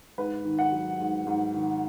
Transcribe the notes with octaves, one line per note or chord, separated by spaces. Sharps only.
G#2 B4
D#3
F#5
F#3
G#2
G#2
D#3